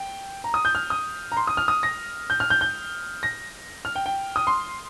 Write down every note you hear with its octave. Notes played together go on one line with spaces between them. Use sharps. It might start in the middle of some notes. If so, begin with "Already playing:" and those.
Already playing: G5
A#5
D#6
G6
F6
D#6
A#5
C6
D#6
F6
D#6
A#6
G6
F6
G6
G6
A#6
F6
G5
G5
D#6
C6